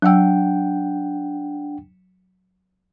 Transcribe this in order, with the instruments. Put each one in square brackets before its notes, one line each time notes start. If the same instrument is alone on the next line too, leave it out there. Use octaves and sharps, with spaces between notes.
[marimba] F#3 E6 [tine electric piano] D4 F#5 G5